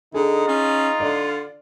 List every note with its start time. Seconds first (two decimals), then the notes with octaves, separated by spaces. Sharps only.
0.14 D3 D#4 G#4
0.48 C#4 F4
1.00 D3 D5